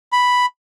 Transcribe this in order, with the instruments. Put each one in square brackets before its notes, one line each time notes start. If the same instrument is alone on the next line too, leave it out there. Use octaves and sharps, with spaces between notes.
[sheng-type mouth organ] B5